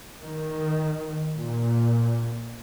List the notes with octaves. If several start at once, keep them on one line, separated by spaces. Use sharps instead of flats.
D#3
A#2